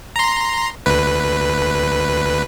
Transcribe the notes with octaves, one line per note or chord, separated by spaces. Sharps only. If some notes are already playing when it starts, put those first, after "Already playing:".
A#5 C6
D2 B4